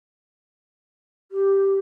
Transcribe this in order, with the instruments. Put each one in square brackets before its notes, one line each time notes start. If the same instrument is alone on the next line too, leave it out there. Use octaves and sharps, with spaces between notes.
[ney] G4